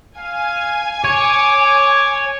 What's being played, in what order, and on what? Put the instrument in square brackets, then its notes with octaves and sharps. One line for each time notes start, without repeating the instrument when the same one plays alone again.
[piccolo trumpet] F5 [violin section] G#5
[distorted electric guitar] C#5 [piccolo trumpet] D6